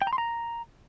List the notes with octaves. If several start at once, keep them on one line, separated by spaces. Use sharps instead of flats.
G5
A#5
C6
A#5